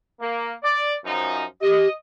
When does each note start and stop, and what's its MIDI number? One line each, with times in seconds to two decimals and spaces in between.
0.20 0.53 58
0.63 0.94 74
1.04 1.44 42
1.04 1.44 53
1.04 1.44 63
1.62 1.87 67
1.62 1.90 75